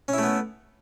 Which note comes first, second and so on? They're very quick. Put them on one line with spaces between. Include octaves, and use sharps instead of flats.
C#4 E4 A3 B3